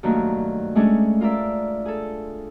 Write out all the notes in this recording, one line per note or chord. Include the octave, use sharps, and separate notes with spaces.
G2 D#3 F#3 A3 A#3
G#3 A3 C#4 D4 G#4
F4 A#4 D5 E5
G#4 A4